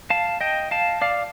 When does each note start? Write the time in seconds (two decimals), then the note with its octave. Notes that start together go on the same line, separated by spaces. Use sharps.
0.10 F5 A5
0.41 D#5 G5
0.71 F5 A5
1.02 D5 F5